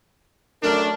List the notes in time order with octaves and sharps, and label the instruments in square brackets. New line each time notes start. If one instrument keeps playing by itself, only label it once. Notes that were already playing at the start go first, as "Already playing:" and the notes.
[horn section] F#2 A3 D4 [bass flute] A#4